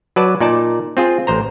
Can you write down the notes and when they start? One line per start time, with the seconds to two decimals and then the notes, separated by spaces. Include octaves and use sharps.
0.16 F#3 B4 D5 A5
0.40 A#2 D#4 D5 A5
0.97 C4 F4 G#4
1.27 A1 C5 A#5